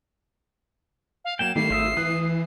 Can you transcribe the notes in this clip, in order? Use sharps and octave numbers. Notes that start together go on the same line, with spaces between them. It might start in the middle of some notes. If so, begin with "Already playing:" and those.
F5
F#3 A#3 G5 E7
D#3 G3 A3 C7
G#1 F4 E5 D#6
E3 D#6 F#6